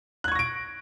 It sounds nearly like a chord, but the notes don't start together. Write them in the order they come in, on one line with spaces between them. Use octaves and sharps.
F#6 G#6 C#6 A#6 D7